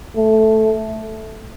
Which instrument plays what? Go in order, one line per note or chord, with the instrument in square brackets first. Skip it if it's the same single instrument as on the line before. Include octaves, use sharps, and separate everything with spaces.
[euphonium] A3